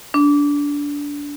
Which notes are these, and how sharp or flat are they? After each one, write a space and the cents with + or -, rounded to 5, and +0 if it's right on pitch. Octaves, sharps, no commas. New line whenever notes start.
D4 -20